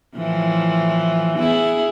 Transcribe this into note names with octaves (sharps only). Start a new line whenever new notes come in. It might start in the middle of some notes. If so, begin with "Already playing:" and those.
A2 E3 F3
B3 E4 G#4